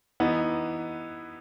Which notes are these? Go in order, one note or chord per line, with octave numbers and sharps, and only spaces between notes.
E3 B3 D#4